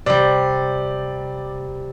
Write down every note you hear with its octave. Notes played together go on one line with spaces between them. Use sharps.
C3 G3 D5